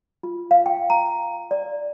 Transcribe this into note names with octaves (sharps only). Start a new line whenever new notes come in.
F4
F5
G5
A#5
D5